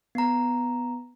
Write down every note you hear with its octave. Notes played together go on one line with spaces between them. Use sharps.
B3 A#5